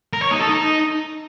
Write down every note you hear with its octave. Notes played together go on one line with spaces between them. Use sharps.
A#4
C#5
D#4
A4
D#4